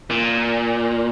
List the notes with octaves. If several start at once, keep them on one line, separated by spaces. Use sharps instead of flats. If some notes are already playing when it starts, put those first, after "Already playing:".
A#2